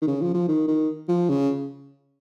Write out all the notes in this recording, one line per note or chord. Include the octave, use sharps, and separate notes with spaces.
D#3
C#3
F3
F3
D#3
D#3
F3
C#3